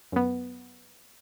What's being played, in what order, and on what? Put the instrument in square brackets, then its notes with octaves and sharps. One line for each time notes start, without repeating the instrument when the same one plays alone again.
[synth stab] F#2 B3